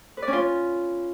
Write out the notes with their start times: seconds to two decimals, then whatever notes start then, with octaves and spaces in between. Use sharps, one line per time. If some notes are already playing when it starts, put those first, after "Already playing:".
0.17 B4
0.22 D5
0.28 C#4
0.33 F4
0.38 C#4